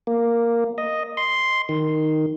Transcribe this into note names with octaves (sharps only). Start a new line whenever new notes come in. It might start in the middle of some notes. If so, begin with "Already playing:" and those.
A#3
D#5
C6
D#3